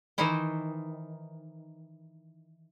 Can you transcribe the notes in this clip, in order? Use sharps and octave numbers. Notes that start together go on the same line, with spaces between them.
D#3 E3 D#4 E4 C5